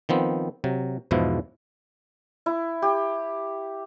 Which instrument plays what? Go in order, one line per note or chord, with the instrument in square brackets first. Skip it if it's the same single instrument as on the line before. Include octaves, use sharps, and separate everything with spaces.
[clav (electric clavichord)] D#3 F3 B3 C4
C3 F#3
E2 G#2 B2 F3 E4
[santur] E4
G4